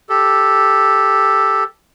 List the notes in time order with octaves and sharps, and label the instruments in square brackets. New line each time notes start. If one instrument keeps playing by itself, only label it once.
[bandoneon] G4 A4